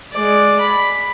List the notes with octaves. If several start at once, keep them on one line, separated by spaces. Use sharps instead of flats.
G#3 D5
B5